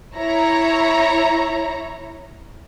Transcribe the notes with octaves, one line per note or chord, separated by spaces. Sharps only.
E4 C#5 A#5